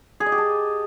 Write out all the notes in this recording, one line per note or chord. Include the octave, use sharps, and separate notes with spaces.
G#4
D#5
G4
A5